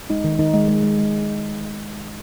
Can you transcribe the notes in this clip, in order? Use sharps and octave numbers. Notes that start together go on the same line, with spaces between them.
G#3 D#4
D#3
D#3 D#4
G#3
G#3
G#3
G#3